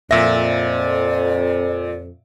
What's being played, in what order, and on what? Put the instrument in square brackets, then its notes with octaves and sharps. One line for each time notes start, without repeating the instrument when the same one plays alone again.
[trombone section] F2 [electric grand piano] A#2 A#6 [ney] D5 [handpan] E5